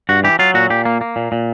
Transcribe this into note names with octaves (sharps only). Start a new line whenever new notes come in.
G2 F#4
E3 G4
F#3 F4
A#2 F#4
A#2 G4
A#3
A#3
A#2
A#2